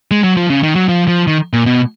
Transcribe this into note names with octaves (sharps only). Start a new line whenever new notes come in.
G#3
F#3
F3
C#3
D#3
F#3
F3
F3
D#3
A#2
B2